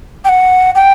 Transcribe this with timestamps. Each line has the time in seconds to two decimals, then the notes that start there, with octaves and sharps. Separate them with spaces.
0.25 G5
0.29 F#5
0.75 G5